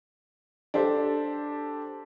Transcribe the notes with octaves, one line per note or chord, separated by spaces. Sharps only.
D4 G4 A4 C5